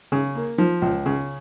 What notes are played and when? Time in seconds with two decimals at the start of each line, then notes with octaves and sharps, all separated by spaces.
0.12 C#3
0.35 A#3
0.58 F3
0.82 C#2
1.06 C#3